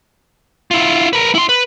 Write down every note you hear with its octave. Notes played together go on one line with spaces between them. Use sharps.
E4 F4
A#4 B4
E4 C6
B4